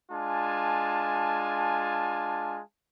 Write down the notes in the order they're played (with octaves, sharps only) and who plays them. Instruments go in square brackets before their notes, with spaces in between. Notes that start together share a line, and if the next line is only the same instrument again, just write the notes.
[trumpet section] G#3 D4 F4 G#5 A5